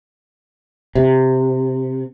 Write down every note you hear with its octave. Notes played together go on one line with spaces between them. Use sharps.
C3